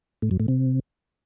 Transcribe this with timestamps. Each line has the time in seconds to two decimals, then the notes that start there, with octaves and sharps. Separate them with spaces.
0.22 A2
0.31 F#2
0.40 A2
0.48 C3